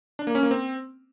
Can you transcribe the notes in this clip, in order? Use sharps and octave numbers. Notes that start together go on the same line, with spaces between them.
D4
A#3
C#4
A#3
C4